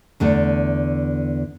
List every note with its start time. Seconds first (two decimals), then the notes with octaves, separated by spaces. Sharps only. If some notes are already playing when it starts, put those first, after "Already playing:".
0.20 E2 D3 A3